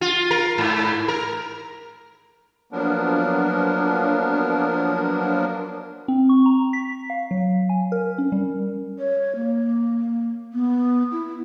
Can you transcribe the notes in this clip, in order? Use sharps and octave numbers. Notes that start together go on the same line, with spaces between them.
F4
A#4
G#2
A#4
F3 F#3 A#3 B3 D4 A#4
C4
C#6
A#5
B6
F5
F#3
G#5
A#4
C#4
G3
C#5
A#3
B3
E4